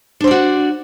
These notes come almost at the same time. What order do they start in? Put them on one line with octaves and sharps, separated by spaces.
D4 C5 D5 F#4